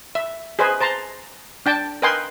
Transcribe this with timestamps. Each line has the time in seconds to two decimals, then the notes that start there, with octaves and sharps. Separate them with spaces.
0.15 E5
0.59 G#4 B4 C5 D#5 G#5
0.81 C5 A5 A#5 C6
1.66 D4 G5 A5
2.02 A#4 B4 D#5 G5 G#5 C6